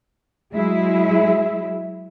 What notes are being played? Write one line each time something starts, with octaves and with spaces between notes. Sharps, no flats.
F#3 G#3 E4 G#4 E5